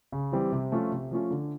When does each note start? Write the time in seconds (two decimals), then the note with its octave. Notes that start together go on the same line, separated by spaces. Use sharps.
0.12 C#3
0.32 E3 G3 C4
0.52 C3
0.72 F3 A3 C#4 F4
0.92 C3
1.11 F3 A3 C#4 F4
1.31 D3